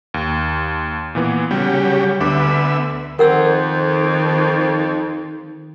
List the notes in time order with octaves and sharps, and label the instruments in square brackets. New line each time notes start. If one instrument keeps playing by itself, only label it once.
[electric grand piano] D#2
A#2 E3 B3
[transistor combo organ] C#3 F#3 G4 [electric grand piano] G3
[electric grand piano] D2 D3 D6 [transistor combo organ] B3 E5
[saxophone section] F2 [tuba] D#3 [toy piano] A#4 F#5 E6